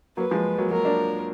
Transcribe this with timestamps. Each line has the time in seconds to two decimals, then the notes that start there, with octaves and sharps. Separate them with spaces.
0.17 F#3 A#3 B4
0.31 F3 G#3
0.58 F#3 A#3
0.71 F#3 A#3 A#4
0.85 A#3 D4